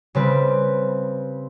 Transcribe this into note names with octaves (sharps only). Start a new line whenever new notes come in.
C#3 G3 C4 B4